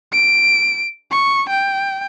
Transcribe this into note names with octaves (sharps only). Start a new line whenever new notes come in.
D7
C#6
G5